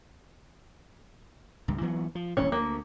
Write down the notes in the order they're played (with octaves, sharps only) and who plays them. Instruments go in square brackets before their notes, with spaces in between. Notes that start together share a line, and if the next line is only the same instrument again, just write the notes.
[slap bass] C#2 G2
E3 F#3 B3
F3
[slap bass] D#1 A1 G#2 [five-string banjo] C#4
[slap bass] D2 [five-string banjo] A#3